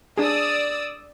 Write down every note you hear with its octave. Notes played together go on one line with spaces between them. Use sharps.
D4 G#4 D5 D#6 E6